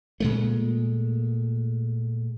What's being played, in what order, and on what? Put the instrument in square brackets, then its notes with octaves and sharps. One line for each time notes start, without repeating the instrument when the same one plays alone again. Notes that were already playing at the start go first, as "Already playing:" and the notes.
[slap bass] A#2 G#3 A3